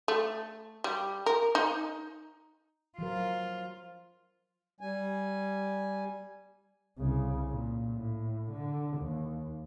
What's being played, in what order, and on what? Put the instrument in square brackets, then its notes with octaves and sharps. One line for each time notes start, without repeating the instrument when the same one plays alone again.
[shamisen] A3
G3
A#4
D#4
[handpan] F3 F#3 A#4 [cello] F4
[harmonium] G3 G#5
[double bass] C2 C#3
A#2
A2
D3
D#2